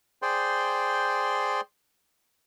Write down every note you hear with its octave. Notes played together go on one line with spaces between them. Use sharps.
G#4 C5 D5 G5 C6